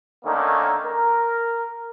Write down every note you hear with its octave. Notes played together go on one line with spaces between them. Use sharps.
D3 D#3 A3 A#3 C#4 D#4
A#4